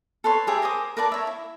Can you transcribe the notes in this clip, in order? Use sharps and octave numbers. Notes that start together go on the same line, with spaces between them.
A4 B4 C#5 C6
G4 G#4 E5
A#4 C5 D6 D#6
A#4 B4 D5 A5
C#5 E5
E4